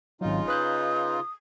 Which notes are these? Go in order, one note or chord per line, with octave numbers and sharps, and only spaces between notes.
G#1 C#3 F#3 D#4 F4
B4 D#6 F#6 G6